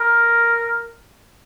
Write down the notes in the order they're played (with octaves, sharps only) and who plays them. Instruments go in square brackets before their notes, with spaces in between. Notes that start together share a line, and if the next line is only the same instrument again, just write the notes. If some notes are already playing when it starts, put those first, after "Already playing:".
Already playing: [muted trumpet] A#4